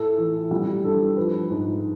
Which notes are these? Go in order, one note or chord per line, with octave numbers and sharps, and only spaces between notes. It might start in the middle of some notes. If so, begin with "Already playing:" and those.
Already playing: A2 A3 A4
E3
G3
G2 A4
F3 B4
G#2